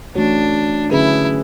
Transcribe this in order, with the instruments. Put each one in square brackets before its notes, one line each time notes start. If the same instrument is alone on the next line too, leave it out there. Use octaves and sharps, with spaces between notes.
[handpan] E3 A3 C#4 F#4 C#5 [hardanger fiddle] D4
[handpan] D3 F#3 C#4 G#4 B4 [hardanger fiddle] E4